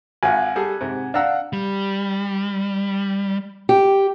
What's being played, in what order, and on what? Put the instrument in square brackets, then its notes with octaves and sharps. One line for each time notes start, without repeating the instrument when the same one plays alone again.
[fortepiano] G#1 F4 [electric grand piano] F#5 G#5
[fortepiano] G3 G#4 A4
G#2 C3
[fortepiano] D4 A#5 E6 [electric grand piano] F5 F#5
[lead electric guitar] G3
[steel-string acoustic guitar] G4